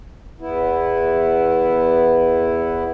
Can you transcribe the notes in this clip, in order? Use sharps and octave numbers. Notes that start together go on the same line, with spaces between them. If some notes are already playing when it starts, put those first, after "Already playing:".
E2 B3 E4